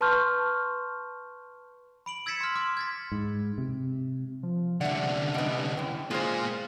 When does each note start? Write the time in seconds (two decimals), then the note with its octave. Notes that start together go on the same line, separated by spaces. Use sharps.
0.01 B4 A5 C6 C#6 F6 G6
2.06 B5 D7 F#7
2.26 E6 G#6 A6 B6 C#7 E7
2.40 C6 F6
2.55 C6 D6 F6
2.77 G#6 A6 B6
3.12 G#2
3.58 C3
4.43 F3
4.81 C2 D3 D5 E5 F#5
5.34 G3 B3 D#5
5.77 F#2 E3 G5
6.11 G#3 A#3 F4 C5 G#5